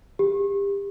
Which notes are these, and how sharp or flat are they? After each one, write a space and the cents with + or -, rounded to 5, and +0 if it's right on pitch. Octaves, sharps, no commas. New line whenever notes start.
G4 +30